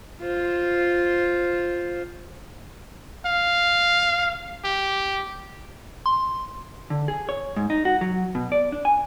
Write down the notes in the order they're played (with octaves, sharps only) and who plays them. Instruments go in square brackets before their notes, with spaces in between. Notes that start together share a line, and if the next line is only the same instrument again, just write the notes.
[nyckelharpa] F4 C5
[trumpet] F5
G4
[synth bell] C6
[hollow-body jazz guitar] D3
G#4
C#5
G#2
D#4
F#4
F#3
B2
D5
D4
G#5